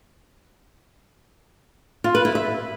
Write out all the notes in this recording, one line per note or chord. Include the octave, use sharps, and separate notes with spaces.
F4
B4
E4
E5